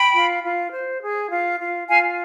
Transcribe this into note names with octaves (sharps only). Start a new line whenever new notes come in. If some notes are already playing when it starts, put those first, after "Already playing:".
Already playing: G5 B5
F4
F4
C5
G#4
F4
F4
F4 F5 G#5